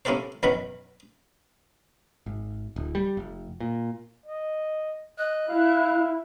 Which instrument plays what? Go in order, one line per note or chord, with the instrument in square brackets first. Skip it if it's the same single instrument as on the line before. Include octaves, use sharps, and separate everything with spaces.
[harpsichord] A#3 C#4 E4 G4 A4 C5
B1 F#2 D#3 E3 F#3 B5
[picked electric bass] G#1
D1
G3
F1
A#2
[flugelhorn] D#5
[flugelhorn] D#5 [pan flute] F#6
[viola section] E4 [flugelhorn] F5